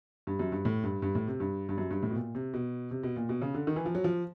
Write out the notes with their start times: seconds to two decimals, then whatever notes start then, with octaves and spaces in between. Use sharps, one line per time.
0.27 G2
0.39 F#2
0.52 G2
0.65 A2
0.84 G2
1.02 G2
1.15 A2
1.28 C3
1.40 G2
1.69 G2
1.78 F#2
1.91 G2
2.03 A2
2.11 B2
2.15 A#2
2.35 C3
2.54 B2
2.91 C3
3.03 B2
3.16 A#2
3.29 B2
3.42 C#3
3.54 D3
3.67 D#3
3.76 E3
3.86 F3
3.95 F#3
4.04 F3